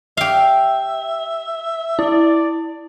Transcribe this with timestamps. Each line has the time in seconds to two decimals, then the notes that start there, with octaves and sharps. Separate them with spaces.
0.17 G4 E5 F5
1.99 E4 D5